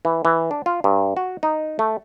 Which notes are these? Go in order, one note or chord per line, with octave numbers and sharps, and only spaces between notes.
E3
E3
D4
F4
G2
F#4
D#4
A3